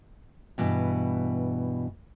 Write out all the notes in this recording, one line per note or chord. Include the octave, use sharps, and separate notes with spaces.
G2 B2 E3